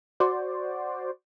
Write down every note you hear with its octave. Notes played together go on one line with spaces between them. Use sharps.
F#4 C5 D5